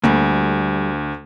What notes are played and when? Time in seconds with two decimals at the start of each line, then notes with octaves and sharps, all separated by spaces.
0.04 D2 G3 A3 A#3